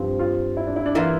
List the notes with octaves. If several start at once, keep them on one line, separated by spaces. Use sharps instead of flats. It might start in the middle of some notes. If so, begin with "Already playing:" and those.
Already playing: G2 F3 C4
F4
E4
D4
E4
D4
E3 A#3 E4 F4